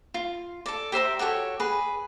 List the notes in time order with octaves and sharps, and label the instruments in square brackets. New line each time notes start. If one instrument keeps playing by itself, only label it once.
[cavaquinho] F4
A4 D5
G4 C5 E5 A#5
F#4 G4 A4 C#5
G#4 B4